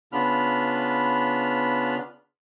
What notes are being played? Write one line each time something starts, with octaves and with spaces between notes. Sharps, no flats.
C#3 B3 D4 F4 B5 F6